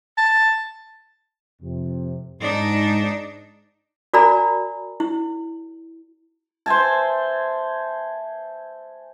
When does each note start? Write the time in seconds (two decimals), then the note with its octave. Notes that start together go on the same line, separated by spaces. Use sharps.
0.17 A5
1.61 F2 C3
2.41 G#2 D4 D#4
4.14 F#4 A#4 D5 G#5 A#5 B5
5.00 E4
6.66 C5 E5 G#5 A5